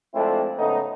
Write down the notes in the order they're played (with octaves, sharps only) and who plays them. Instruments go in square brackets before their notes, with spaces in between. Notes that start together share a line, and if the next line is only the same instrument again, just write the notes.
[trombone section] F3 G#3 A3 C4 D4 E4
G#2 C#3 A3 B3 D#4